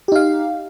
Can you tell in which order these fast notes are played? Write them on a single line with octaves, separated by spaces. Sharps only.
G4 D#4 F5